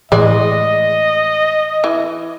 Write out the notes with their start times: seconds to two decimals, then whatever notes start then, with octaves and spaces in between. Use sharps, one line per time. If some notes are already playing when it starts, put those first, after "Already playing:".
0.12 A2 E3 G#3 D5 D#5
1.84 E3